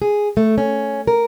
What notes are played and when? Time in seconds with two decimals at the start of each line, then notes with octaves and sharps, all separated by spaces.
0.02 G#4
0.37 A3
0.58 C#4
1.07 A#4